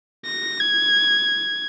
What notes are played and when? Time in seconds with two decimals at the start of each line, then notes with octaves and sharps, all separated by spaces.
0.26 A#6
0.60 G#6